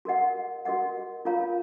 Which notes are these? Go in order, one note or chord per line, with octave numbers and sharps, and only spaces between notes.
F#4 A#4 D#5 F#5
F#4 A#4 D#5 F#5
F4 A#4 C#5 F5 A#5